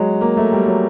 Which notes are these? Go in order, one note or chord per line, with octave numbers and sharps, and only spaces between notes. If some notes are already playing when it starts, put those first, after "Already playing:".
Already playing: F#3 G#3
A#3
A3
G3
F#3